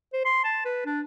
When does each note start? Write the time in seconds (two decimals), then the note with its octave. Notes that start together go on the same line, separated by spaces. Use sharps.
0.13 C5
0.25 C6
0.44 A5
0.65 B4
0.86 D4